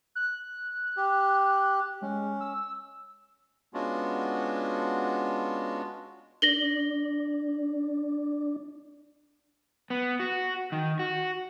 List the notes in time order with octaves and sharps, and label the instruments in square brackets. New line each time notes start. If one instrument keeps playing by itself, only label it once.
[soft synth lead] F#6
[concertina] G4
[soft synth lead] G#3 [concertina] C#4
[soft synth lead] E6
[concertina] G#3 B3 C#4 D4 F4 F#4
[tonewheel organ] D4 [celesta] A#6 F#7 G7
[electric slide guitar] B3
F#4
D#3
F#4